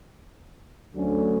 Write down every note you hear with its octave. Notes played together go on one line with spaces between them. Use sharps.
D2 D3 F#3 A3 C#4